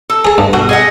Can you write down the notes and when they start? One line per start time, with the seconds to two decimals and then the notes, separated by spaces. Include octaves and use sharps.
0.10 A4
0.25 G#4 A5
0.38 G2
0.53 B2 F#4
0.69 G#4 D#5 F#5